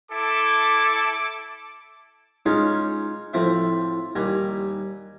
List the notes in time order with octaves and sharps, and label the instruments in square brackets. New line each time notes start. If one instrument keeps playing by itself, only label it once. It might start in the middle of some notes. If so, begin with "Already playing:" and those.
[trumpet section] E4 A4 [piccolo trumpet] D6
[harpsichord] G#3 C#4 D#4 F4 G#4 C#5
A2 F3 C4 E5
D#2 G3 G#5 A#5